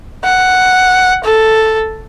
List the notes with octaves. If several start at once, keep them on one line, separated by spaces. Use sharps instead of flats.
F#5
A4